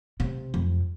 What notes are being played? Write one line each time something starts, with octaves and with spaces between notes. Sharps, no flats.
C3
F2